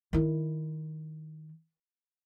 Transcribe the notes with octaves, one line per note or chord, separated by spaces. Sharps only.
D#3 E4